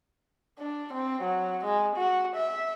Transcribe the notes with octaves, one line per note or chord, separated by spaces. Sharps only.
D4
C4
F#3
G#3
F#4
E5